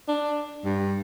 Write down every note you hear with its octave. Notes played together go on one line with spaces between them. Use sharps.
D4
G2